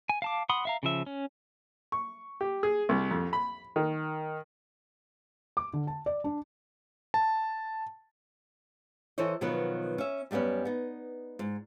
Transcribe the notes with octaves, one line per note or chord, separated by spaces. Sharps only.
G#5
F5 A5 D6
F#5 B5 C6 D#6
E5 F5 A#5
C#3 F3 E5
C#4
C#6
G4
G#4
C2
F2
B5
D#3
D6
D3
A5
D5
D4
A5
E3 A4 C5 C#5 D#5
B2 D#3 F3 F#3 B3 B4
C#4 E5
F#2 G3 A3 B3 C#4
B3 D#4
G#2